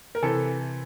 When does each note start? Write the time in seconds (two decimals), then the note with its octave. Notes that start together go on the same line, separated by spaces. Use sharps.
0.15 A#4
0.22 C3 E3 A4